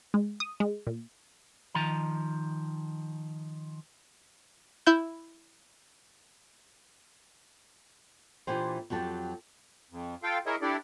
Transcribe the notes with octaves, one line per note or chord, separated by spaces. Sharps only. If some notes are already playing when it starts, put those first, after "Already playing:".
G#3
D#6
G#3
A#2
D#3 F3 A#5
E4 G6
A#2 E3 D4 G4 C5
F2 F#3 G4 A5
F2
F4 A4 F5 G5
E4 G#4 A#4 C#5 D#5 E5
D4 E4 G4 A4 D5